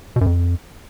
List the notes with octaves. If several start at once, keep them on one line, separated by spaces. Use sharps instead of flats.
B2
F#2
F2